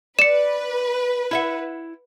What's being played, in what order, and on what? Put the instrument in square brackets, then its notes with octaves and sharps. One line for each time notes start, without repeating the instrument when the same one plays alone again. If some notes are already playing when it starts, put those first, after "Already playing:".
[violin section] B4 [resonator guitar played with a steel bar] D5 [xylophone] C#7 E7
[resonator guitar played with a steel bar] E4 E5 F#5